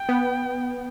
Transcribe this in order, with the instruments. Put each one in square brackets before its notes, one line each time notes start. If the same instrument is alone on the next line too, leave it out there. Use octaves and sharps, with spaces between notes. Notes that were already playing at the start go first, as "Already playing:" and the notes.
Already playing: [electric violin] G5
[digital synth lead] B3